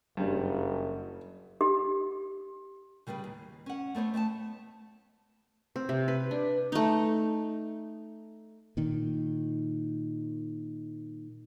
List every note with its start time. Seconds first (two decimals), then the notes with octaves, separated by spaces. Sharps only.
0.17 F#1 G2 G3
1.61 G4
3.07 C#3 G3 G#4 A4 B4
3.24 D#2
3.66 C#4 F#5
3.95 A3 B3 C5 C#5
4.14 A3 E5 G#5 A5
5.76 C4
5.89 C3
6.08 B4
6.31 D4
6.72 A3 D#4
8.77 A#2 D#3